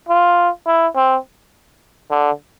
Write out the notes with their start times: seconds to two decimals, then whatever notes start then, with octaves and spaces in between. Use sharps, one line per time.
0.09 F4
0.67 E4
0.96 C4
2.11 D3